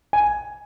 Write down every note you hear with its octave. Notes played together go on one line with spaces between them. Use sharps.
G#5